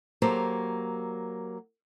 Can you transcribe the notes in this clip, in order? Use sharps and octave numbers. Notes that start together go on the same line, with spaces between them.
F#3 A#3 G4 A4 C5